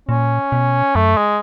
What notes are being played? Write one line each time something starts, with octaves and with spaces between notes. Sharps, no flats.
A#2 C#4
B2
F#2 A3
G#3